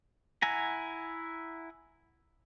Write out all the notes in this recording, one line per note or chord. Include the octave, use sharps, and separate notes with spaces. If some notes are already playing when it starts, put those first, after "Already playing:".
E4 F#5 G#5 A#5